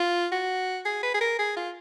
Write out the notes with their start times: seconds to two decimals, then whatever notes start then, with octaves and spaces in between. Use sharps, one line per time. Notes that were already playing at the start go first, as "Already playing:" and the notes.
Already playing: F4
0.32 F#4
0.85 G#4
1.03 B4
1.14 G#4
1.21 A#4
1.39 G#4
1.57 F4